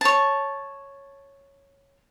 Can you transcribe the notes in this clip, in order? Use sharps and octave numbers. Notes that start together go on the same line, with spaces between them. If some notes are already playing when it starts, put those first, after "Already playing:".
C#5 A5